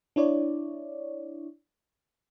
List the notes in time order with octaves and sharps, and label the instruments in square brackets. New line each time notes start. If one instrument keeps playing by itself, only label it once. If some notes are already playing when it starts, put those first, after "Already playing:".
[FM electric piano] D4 E4 C#5 D5